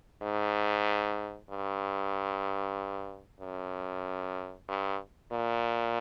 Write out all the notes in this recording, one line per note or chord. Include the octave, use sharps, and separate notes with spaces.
G#2
G2
F#2
G2
A#2